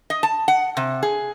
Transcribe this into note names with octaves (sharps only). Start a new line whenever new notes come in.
D#5
A5
F#5
C3
G#4